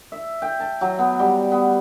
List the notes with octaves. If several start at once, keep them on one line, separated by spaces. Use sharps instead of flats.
E5
G5
A5
F#3
B3
G3
B3